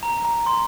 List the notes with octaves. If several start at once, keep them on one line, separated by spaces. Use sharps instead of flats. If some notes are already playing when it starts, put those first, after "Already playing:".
A#5
A#5
C6